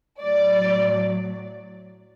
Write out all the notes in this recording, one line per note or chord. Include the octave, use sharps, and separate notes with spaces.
A2 F#3 D5